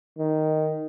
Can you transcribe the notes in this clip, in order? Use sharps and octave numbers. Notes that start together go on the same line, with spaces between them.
D#3